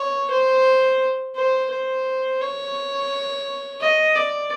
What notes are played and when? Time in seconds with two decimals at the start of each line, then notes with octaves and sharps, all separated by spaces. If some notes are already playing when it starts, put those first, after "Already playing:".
Already playing: C#5
0.30 C5
1.36 C5
1.70 C5
2.41 C#5
3.80 D#5
4.15 D5